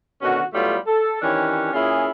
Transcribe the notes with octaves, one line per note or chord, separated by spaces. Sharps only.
B2 D3 D#3 C#4 F#4
A2 F#3 G3 A3 B3 F4
A4
D#3 E3 C#4 D4 G4 C#5
A#2 C#4 E4 F4 G#4